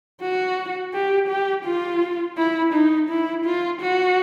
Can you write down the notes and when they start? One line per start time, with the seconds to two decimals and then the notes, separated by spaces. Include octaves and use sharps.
0.21 F#4
0.93 G4
1.29 G4
1.65 F4
2.37 E4
2.73 D#4
3.09 E4
3.45 F4
3.82 F#4